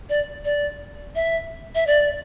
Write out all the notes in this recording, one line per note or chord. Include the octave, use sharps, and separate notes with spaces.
D5
D5
E5
E5
D5